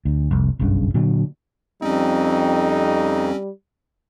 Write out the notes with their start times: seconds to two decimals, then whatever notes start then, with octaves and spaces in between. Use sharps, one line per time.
0.05 D2
0.31 F1 C2
0.59 F#1 B1 G2 C#3
0.94 A#2 D3 F#3
1.82 F2 G3 C4 C#4 D#4